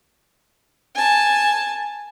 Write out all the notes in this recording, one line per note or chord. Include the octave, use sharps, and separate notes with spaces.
G#5 A5